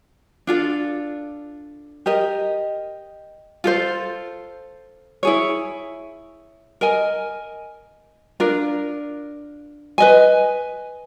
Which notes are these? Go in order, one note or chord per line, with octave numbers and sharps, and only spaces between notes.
D4 F4 A4
G4 A#4 D#5
F4 A4 C5
E4 G#4 C#5
A#4 D#5 G#5
D4 F4 A#4
B4 D#5 G#5